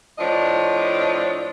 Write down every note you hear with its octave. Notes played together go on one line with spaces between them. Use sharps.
A2 F3 D4 C#5 D#5